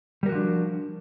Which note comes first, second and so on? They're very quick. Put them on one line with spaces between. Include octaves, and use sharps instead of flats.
G3 A#4 F#4 F3 D4